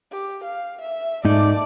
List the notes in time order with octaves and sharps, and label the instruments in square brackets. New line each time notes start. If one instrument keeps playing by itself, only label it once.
[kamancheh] G4
F5
E5
[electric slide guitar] G#2 D#4 [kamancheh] A3 D5